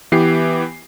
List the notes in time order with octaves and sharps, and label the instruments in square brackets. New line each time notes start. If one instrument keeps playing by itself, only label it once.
[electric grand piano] E3 B3 G4 C7